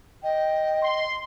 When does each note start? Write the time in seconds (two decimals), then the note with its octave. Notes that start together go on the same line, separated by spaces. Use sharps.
0.23 D#5 G5
0.83 C6